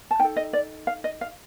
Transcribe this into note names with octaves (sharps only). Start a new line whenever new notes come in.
A5
D#4 A4 G5
D#5
D5
F5
D#5
F5